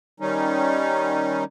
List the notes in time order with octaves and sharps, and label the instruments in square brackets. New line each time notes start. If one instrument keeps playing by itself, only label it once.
[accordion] D#3 G3 C#4 D#4